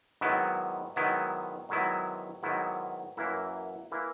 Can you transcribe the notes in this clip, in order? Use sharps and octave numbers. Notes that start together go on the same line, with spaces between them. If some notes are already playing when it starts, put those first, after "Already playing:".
G#2 D#3 F#3 B3 E4
G#2 D#3 F#3 B3 E4
G#2 D#3 F#3 B3 E4
G#2 D#3 F#3 B3 E4
F#2 E3 A#3 E4
E3 A#3 E4